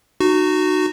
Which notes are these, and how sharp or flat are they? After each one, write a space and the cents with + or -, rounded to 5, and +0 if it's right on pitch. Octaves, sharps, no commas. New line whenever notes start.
D#4 -30 F#4 +0